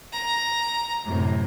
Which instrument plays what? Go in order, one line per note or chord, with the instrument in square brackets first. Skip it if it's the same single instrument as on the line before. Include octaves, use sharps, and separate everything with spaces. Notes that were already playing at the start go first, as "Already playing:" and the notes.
[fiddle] A#5
[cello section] F#2 A2 C3